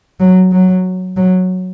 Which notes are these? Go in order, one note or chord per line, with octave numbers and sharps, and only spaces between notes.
F#3
F#3
F#3